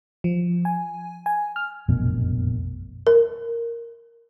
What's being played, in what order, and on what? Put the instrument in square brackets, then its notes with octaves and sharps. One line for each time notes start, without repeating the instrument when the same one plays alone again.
[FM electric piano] F3
G#5
G#5
F6
[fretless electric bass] F1 A#1 F#2 B2
[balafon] A#4